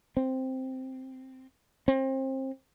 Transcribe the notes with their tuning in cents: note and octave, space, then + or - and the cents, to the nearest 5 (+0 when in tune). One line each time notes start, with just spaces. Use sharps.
C4 +0
C4 +30